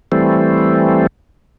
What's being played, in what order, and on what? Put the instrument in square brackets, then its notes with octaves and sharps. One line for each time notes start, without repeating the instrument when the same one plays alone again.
[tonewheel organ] E3 G3 A3 C4